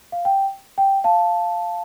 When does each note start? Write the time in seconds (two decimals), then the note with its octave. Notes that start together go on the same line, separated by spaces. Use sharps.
0.12 F5
0.25 G5
0.78 G5
1.04 F5 A5